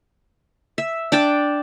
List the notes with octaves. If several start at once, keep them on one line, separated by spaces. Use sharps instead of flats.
E5
D4 G5 A5 D6